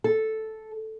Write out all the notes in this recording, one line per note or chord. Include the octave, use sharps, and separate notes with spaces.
A4